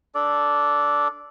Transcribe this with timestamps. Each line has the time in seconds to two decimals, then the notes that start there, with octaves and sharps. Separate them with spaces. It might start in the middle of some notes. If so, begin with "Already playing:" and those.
0.15 D4 A4 D5